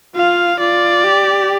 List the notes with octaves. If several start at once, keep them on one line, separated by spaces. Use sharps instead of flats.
F4 F5
F4 D5
G4